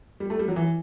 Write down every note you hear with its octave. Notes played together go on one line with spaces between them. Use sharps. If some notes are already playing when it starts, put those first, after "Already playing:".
G3
A3
G3
F#3
E3